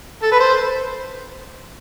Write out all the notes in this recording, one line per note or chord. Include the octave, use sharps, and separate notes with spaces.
A4
B4
C5